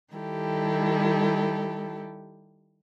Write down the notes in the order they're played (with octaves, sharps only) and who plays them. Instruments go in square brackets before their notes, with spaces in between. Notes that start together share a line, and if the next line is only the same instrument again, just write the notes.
[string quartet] D#3 G3 E4 G4 A4